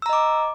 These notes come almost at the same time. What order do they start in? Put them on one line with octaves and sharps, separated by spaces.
E6 A#5 D#5 D6